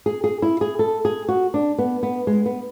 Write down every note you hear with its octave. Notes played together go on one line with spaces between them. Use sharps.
G#4
G#4
E4
G#4
A4
G#4
F#4
D4
B3
B3
G#3
B3